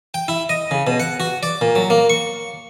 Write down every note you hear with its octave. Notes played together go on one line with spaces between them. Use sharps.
G5
E4
D#5
C#3
B2
F#5
F#4
D5
A#2
F#3
A#3
C#6